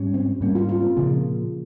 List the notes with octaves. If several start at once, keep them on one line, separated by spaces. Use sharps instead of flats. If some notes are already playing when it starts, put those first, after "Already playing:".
Already playing: G#2 G3 C#4
C4
G#2 G3 A#3 C#4
F4
F4
C4
A#2 C#3 F3 A#3